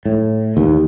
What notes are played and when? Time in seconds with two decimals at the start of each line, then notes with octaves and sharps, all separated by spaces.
0.05 A2
0.57 D#2